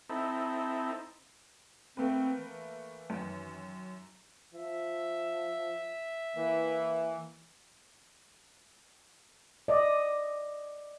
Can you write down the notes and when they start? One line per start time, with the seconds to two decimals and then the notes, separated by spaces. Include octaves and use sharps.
0.09 C4 D#4 E4 A4
1.97 A3 A#3 C4 B4
2.37 E3
3.10 F#2 D#3
4.54 F3 E5
6.36 E3 A#3
9.68 D5 D#5